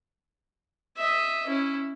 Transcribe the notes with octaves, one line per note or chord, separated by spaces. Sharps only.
D#5 E5
C#4 E4